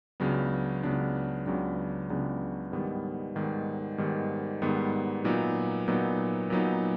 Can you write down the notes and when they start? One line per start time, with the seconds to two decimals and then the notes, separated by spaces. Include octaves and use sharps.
0.20 C#2 C#3 F#3 B3 D4
0.83 C#2 C#3 F#3 B3 D4
1.46 C#2 C#3 F#3 B3 D4
2.10 C#2 C#3 F#3 B3 D4
2.72 G#2 D#3 G3 B3
3.36 G#2 D#3 G3 B3
3.98 G#2 D#3 G3 B3
4.62 G#2 D#3 G3 B3
5.24 A#2 F#3 B3 D#4
5.88 A#2 F#3 B3 D#4
6.50 A#2 F#3 B3 D#4